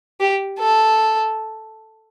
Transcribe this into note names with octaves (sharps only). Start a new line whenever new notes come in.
G4
A4